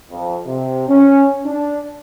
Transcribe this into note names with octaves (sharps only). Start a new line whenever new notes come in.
F2
C3
C#4
D4